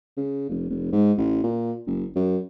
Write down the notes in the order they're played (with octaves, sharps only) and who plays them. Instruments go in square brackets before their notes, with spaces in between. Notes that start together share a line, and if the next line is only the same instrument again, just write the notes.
[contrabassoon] C#3
F1
F1
G#2
A1
A#2
F#1
F#2